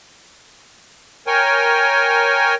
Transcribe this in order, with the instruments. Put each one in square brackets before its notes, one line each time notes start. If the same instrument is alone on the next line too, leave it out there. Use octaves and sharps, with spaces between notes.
[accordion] A#4 C#5 G5 G#5